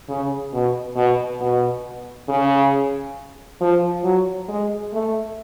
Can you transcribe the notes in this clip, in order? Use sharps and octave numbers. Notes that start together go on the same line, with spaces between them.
C#3
B2
B2
B2
C#3
F3
F#3
G#3
A3